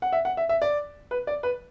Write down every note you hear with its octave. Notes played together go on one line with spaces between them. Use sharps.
F#5
E5
F#5
E5
E5
D5
B4
D5
B4